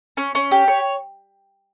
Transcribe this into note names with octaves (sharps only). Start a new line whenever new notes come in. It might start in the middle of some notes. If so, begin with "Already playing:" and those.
C#4
C#4
G4
C#5